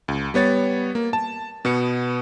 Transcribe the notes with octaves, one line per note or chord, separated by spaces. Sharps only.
C#2
G3 B3 C#5 A6
A#3
A5
B2 B3 C#7